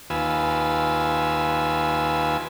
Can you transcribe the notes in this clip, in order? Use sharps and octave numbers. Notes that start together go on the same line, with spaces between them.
D#2 F4 B4 G#5 E6